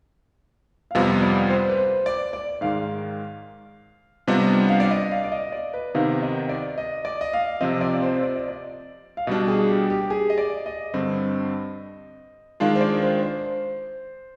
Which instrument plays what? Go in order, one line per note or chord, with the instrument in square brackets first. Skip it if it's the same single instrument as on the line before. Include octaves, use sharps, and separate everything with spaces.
[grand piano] F5
[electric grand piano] F2 C3 G3 B3 F4 [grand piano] D#5
[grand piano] D5
C5
B4
C5
D5
D5
[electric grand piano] G#2 D#3 G#3 [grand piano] F5
[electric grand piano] C3 G3 B3 D4 F4 [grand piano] D#5
[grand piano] F5
D5
D#5
F5
D5
D#5
D5
B4
[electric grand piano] C3 D#3 B3 D#4 [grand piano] F5
[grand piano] D#5
D5
D#5
D5
D#5
F5
[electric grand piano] C3 F3 C4 [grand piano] D#5
[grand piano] D5
C5
D5
D#5
D5
F5
[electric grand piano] B2 G3 D4 [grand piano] D#5
[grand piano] G#4
G4
G4
G4
G#4
D#5
D5
D#5
[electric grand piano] G2 D3 G3 C4
[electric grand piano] D#3 G#3 D4 F4 [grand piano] F5
[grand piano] C5
D5
C5
C5